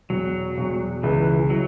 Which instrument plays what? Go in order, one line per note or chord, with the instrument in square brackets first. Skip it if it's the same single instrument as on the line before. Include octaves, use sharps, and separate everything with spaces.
[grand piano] E1 [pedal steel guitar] F#3
[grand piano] E1
[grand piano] C#2 [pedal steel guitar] E3
[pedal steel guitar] F#3